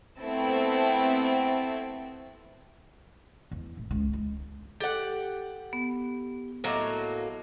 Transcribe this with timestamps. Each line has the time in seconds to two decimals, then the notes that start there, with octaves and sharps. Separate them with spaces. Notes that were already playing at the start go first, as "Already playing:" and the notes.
0.21 A3 B3 C4 E4 A4
3.51 E2
3.77 D1
3.91 C#2
4.13 G#3
4.80 G4 A4 F#5
5.73 B3
6.64 A2 F#3 A#3 D#5 E5 D6